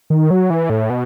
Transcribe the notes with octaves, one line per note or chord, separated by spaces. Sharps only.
D#3
F#3
E3
A2
B2